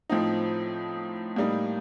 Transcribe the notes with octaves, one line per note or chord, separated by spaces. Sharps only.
A2 F3 C4 D#4
A2 G3 A#3 D#4